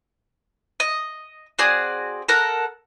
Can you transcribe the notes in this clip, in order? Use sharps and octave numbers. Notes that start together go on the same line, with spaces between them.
D#5
C4 F#4 G#4 D5
A4 A#4 F#5